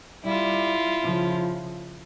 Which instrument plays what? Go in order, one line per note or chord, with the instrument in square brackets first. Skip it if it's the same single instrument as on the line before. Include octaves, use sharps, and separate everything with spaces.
[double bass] G3 [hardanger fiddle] E4 F4
[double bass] C#3 F3